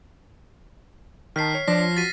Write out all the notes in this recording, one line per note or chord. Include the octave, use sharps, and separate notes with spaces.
D#3 D#5 A5 F6 B6 C7
C#5
F3 D4 A#6
F#4 A6 B6 D#7